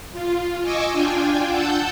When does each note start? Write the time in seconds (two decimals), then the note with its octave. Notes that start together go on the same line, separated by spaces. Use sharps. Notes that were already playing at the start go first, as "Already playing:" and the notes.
0.12 F4
0.62 D#5 G#5 C#6 D6 E6
0.92 D4 F4 G5 G#5
1.49 F#5 A5 E6 G6